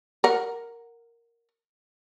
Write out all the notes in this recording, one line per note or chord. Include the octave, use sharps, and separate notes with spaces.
A#4 F#5